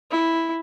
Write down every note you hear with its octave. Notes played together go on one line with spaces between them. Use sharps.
E4